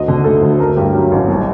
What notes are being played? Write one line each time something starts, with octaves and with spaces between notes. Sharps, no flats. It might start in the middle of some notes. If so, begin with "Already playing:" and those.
Already playing: D2 D#5
D3
A3 A4
D2
A3 A#4
G2 G4
F#3
A1
C2